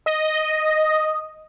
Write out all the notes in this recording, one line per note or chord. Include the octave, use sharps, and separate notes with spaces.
D#5